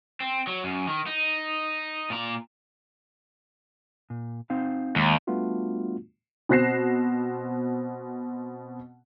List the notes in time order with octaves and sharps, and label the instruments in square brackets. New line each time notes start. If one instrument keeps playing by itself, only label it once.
[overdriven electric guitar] C4
F#3
F#2
D#3
D#4
A#2 A#5
[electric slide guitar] A#2
C4 D#4 F5
[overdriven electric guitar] D#2 [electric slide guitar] G#3
[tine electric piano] G3 A3 B3 D4 F4 F#4
[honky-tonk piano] B2 C4 F#6 A#6 C7 E7